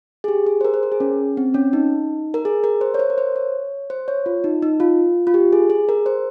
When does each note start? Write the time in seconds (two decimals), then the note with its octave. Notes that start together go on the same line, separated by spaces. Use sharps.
0.24 G#4
0.28 G4
0.47 G#4
0.61 C5
0.65 A#4
0.74 C5
0.83 A#4
0.92 G#4
1.00 C#4
1.37 C4
1.54 C#4
1.73 D#4
2.34 A#4
2.45 G#4
2.64 A#4
2.81 C5
2.94 C#5
2.99 C5
3.10 A#4
3.18 C5
3.36 C#5
3.90 C5
4.08 C#5
4.26 F4
4.44 D#4
4.62 D#4
4.80 F4
5.27 F4
5.34 G4
5.53 G#4
5.70 G#4
5.89 A#4
6.06 C5